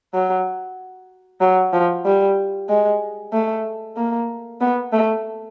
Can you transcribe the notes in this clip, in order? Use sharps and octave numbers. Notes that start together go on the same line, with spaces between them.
F#3
F#3
F3
G3
G#3
A3
A#3
B3
A3